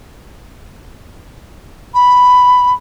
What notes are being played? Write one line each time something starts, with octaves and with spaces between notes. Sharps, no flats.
B5